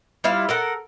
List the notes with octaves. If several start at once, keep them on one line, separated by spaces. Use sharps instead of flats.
G3 E4 F4 F5
A4 A#4 F#5